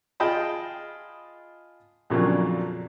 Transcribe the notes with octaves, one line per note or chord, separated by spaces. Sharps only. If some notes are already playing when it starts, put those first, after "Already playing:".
F4 G#4 D#5 G5 A5 B5
F2 A#2 C#3 F#3 D4